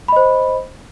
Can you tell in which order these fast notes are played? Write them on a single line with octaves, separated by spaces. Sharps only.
B5 D#5 C5